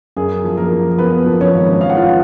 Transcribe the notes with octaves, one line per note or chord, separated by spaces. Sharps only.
F#2 G#4
F3
A#3 A#4
F3
F#2 B3 B4
F3
C#4 C#5
G#1
F3 F5
F#5
F4 F5
F#5